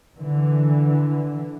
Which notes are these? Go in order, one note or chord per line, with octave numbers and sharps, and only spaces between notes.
D3 E3